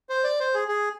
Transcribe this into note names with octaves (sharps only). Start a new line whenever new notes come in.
C5
D5
C5
G#4
G#4